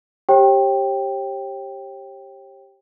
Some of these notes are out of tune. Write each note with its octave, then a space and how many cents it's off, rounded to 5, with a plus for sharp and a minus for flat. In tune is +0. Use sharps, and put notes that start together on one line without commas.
G4 +0 C#5 -45 G5 +0